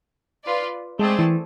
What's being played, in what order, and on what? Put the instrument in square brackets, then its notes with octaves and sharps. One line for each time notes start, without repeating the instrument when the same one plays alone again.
[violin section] F4 B4 D5
[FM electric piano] G#3 [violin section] A3 C4 G#4 D5 A5
[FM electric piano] E3